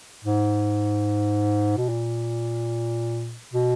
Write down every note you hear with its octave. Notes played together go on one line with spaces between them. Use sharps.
G#2
B2
A#2
B2